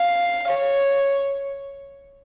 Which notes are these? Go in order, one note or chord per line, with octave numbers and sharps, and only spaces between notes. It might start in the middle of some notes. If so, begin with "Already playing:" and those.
Already playing: F5
C#5